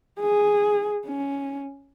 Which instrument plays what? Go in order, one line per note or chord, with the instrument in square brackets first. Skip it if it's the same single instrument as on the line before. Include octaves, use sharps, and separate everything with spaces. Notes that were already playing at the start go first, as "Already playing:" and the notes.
[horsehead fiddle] G#4
C#4